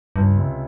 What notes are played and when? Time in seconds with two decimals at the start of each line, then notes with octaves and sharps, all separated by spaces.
0.16 C#2 G2
0.38 C3